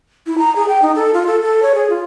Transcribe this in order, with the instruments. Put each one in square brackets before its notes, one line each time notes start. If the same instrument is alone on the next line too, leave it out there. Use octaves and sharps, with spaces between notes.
[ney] E4
A#5
G#4
G5
D#4
A4
F4
A4
A4
C#5
G#4
F4